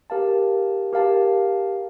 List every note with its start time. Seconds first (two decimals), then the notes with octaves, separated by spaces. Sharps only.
0.10 G4 A#4 F5 A5
0.93 G4 A#4 F5 A5